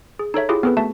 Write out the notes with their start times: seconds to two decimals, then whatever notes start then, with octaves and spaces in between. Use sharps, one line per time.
0.19 G#4
0.34 D#4 A4 C#5 E5
0.49 E4 F4 G4 G#4
0.63 B3 C4 G#4 A4 B4
0.77 A3 F#4 E5 A5